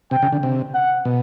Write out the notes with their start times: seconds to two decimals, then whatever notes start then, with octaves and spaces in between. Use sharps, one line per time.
0.11 C3 G5
0.22 C#3
0.32 D3
0.43 C3
0.74 F#5
1.05 B2